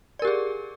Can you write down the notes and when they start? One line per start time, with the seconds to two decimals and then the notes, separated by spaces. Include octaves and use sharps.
0.19 D5
0.22 A#4
0.25 G4
0.27 G#4